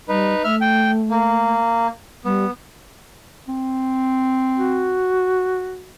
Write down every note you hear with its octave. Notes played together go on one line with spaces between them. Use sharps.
G3 D#4 B4
A3 E5 F6
G5
A#3
G3 B3
C4
F#4